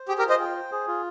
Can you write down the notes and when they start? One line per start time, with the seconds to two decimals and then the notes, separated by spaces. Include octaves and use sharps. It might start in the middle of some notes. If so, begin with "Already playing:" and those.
Already playing: C5
0.08 G4 G#4
0.18 G4 A#4
0.24 F4
0.29 C5 D#5
0.40 G5
0.55 C5
0.72 G#4
0.88 F4